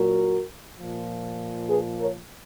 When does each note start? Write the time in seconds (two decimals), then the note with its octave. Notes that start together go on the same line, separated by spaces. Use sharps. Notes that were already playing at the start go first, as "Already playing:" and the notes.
Already playing: A#2 F#3 F#4 A#4
0.79 A#2 F3
1.69 G#4 B4
2.00 A#4 C#5